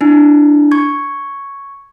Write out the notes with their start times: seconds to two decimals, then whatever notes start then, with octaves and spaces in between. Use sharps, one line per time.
0.01 D4 E4
0.71 C#6 G#6